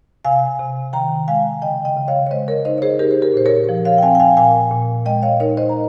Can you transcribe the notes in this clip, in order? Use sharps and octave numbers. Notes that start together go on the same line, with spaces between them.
C3 F5 G#5
C3
D#3 G5 A#5
G#3 F5 G#5
C#3 D#5 G5
D#5 G5
C#3
C#5 F5
C#5
G#3 C5 D#5
A#4 C#5
D#4 C5 D#5
C#5
G#4 C5
D#4 G4 A#4
C5
G4 A#4
A#2 C5
A#4 C#5
F3
C#5 F5
G5
C4 F5 G#5
G5
F5 G#5
A#2 F5 G#5
A#2
G#3 D#5 G5
C#5 F5
D#4 A#4 C#5
C5 D#5
A#5